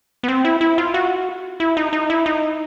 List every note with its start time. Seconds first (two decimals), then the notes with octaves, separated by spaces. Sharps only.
0.23 B3
0.28 C4
0.45 E4
0.61 E4
0.78 F4
0.94 F#4
1.60 E4
1.77 D#4
1.93 D#4
2.10 E4
2.26 D#4